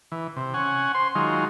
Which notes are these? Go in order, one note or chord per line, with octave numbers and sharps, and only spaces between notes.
E3
C3
C#4 F#5 G#5
C5 C6
D#3 F#3 G#3 F4